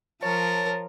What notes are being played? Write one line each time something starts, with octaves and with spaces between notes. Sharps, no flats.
F3 A#4 C#5 A5